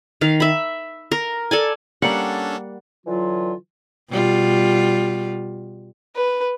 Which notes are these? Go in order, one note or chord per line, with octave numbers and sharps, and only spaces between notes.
D#3 F5
E5 B5
A#4
A4 D5 G#5
G3 A#3 C#4 D4 A4 D5 F#5
D3 E3 F#3 F4
B2 G3 F4
B4